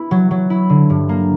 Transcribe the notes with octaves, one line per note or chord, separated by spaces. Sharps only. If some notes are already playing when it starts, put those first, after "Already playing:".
Already playing: B3 E4
F#3
F#3
E4
D3
G2
A#3